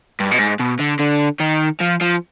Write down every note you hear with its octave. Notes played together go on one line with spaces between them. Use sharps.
G2
B2
G#2
B2
D3
D3
D#3
F3
F3